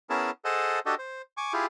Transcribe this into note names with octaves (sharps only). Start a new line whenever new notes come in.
B3 C#4 E4 G#4 A#4 A5
G#4 A4 C5 D#5 F#5 A5
D4 F#4 G4 A4 D#5
C5
G#5 C#6 D6
E4 F4 G4 G#4